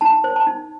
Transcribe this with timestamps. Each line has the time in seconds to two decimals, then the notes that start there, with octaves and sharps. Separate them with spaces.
0.01 D#4 A5
0.24 C5
0.36 A5
0.47 D#4